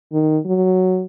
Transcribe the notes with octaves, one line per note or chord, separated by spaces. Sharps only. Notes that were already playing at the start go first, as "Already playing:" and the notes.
D#3
F#3